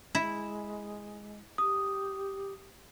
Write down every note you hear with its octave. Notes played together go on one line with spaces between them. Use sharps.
G#3 E4
G4 D#6